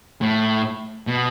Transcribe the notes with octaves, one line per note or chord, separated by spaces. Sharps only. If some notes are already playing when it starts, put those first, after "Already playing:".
A2
B2